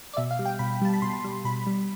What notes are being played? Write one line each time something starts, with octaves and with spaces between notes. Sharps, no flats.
D5
B2 E5
F5
G3
G5
B2 B5
G3 A5
B5
B2 C6
G3
B2 B5
G3